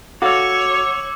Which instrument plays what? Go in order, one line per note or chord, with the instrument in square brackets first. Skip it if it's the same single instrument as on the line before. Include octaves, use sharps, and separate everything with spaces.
[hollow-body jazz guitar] F#4 A4 F5 [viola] C#5 C#6 [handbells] F#5 [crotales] D6 E6